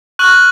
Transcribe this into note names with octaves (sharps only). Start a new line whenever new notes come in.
C#6 F6 F#6 F#7